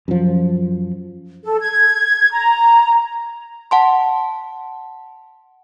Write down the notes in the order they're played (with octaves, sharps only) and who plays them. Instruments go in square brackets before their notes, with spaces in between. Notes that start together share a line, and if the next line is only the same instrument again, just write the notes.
[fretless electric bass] F#2 F3
[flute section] A4
G#6
A#5
[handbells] F#5 A5 C6